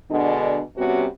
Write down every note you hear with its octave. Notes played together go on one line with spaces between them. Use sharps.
B2 D3 G#3 D4
C3 G3 B3 C#4 F#4